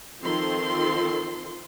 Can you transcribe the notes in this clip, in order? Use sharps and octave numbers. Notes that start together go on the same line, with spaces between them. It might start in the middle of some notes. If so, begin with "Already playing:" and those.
D#3 F3 C4 F4 A4 C6